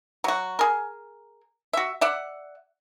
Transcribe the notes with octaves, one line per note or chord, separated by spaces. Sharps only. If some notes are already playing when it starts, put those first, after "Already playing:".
F#3 F#4
G#4 A#4
F#4 E5
D5 E5 F#5